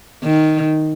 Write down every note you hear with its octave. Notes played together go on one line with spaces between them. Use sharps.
D#3